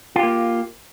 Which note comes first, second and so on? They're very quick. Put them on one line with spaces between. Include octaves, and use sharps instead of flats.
F4 G4 A#3